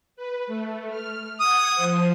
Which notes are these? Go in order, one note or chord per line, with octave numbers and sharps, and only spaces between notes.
B4
A3
F6
F#5 D#6 G#6
F3 C5